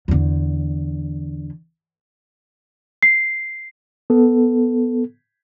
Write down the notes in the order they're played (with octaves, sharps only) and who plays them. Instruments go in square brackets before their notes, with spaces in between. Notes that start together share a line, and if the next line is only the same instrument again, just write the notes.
[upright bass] E2 D3
[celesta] C7
[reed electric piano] B3 A4